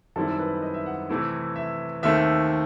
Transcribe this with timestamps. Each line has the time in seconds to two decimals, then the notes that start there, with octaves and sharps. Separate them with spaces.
0.16 F#2 D#3 G3 C4 E4 A4
0.39 B4
0.62 D#5
0.74 E5
0.86 F#5
1.09 C3 E3 A3 E4
1.56 E5
2.03 D#2 D#3 A3 C4 E5